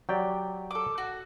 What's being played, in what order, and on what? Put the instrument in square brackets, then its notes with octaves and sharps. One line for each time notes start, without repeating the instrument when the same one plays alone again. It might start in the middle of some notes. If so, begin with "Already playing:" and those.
[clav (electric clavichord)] F#3 G4 D5 [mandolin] G5
[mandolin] A4 D6
F#4